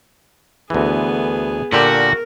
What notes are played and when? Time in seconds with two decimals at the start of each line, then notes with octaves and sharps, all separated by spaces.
0.70 D2 E3 B3 G#4
1.73 A#2 D3 F#4 G4 A#4